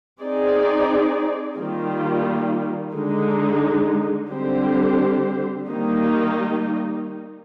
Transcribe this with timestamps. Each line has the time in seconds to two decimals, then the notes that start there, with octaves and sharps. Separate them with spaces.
0.20 C4 D#4 G#4 D5
1.58 D#3 G3 A#3 F4
2.94 D3 G#3 D#4
4.30 D3 G3 C4 G4 C5
5.68 D#3 G3 A#3 D#4